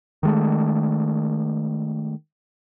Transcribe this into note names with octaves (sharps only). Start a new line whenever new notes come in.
D#3 G#3 A3